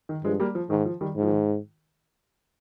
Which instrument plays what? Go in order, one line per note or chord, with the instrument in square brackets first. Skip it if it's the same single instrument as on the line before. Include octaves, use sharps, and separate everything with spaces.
[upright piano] D#3
[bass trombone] G2 [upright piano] F3 G#3
[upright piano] G3 A#3
F3
[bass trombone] G#2 [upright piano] D#3
[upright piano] F3
D#3 G3
[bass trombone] G#2
[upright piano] F3
D#3